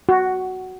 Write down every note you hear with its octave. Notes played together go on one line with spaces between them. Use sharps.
F#4